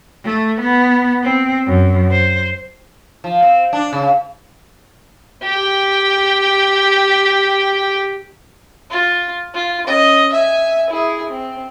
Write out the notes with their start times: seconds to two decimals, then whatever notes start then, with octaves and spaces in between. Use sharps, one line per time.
0.25 A3
0.61 B3
1.23 C4
1.67 F#2
2.11 C5
3.24 F3
3.42 C4
3.73 D4
3.93 C#3
5.43 G4 G5
8.90 F4
9.54 F4
9.87 C#4 D#5
10.33 E5 G#5
10.90 E4 G#4
11.29 C4